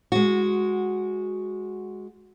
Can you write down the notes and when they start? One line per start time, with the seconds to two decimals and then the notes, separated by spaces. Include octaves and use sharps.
0.12 G#3 F#4